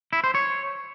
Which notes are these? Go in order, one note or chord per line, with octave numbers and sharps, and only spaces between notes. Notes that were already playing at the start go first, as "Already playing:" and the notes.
E4
C5
C#5